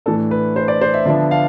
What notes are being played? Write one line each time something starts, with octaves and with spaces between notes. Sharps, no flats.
A2 E3 A3 D4 A4
B4
C5
D5
C5
E5
D3 F3 B3 D4 E5
F5